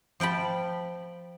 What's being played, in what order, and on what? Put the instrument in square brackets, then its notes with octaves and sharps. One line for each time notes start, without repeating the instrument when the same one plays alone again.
[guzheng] F3 G5 A5 B5